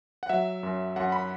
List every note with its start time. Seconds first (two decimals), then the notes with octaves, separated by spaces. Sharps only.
0.23 F#5
0.29 F#3 E5
0.63 F#2
0.96 F#2 F#5
1.12 B5